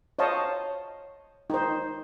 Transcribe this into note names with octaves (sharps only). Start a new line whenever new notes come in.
C5 C#5 D#5 F5 A5
D#4 C5